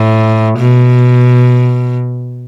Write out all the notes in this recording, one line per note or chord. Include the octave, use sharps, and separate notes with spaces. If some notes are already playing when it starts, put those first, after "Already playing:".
Already playing: A2
B2